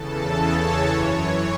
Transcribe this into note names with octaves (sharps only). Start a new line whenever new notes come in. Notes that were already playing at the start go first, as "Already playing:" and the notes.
Already playing: E2 C#3 E3 A4 A5
C#5
F#2 E3